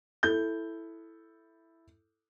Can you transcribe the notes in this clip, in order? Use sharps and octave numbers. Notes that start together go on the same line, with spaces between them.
E4 A4 G6